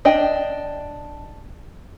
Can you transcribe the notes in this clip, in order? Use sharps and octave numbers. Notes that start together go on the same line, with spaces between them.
D4 D#5 G5